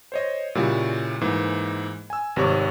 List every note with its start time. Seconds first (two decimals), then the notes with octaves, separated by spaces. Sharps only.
0.12 C5 C#5 D#5
0.55 A#2 C#3 G3 E4 F#4
1.21 G#2 E3 A#3
2.10 G#5 E6
2.36 G#1 C3 G3 C#5 C#6 D6